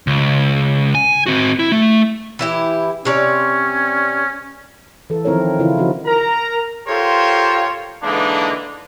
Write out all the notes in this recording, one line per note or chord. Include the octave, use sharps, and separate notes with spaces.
C#2
G#5
C4 F#4
E4
A3
E3 E4 G4
C3 C#4 C#5 D5
E3 A4
D#3 F3 C4 E4 A#4 C#5
C#3 E3 E4 F4
F3 C4 D#4 F#4
A#4 A#5
F4 G4 A4 A#4 C5 C#5
D3 E3 G#3 A#3 D4 D#4